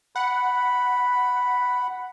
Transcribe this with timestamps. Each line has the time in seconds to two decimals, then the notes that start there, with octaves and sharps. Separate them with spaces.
0.16 F#5 B5